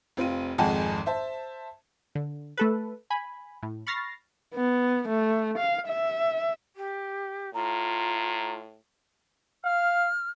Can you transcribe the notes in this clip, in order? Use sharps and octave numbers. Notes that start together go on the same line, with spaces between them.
F1 C4 F4 D#7
G#1 F2 G#3 F#5 G#5 A5
C5 E5 A5
D3
A3 A4 B4
G#5 B5
A2
B5 C#6 F6 A6 A#6 C7
B3
A3
F5
E5
G4
A2 F4 A#5
F5 F6